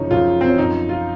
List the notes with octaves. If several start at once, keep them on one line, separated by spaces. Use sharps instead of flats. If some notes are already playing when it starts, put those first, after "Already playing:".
Already playing: F#2 C#3 F3 C#4 D#4
F#2 C#3 F3 F4
C4
C#4
F#2 F3 D#4
F4